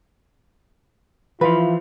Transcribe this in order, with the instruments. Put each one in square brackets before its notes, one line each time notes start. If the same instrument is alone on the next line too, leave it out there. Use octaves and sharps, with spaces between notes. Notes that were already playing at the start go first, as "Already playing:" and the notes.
[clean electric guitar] E3 F3 [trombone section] E4 F4 [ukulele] B4